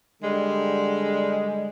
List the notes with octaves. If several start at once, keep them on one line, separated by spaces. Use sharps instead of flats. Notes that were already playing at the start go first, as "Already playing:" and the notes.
D3 G3 G#3